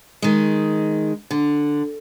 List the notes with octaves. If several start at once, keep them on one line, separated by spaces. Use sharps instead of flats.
D#3 G#3
D3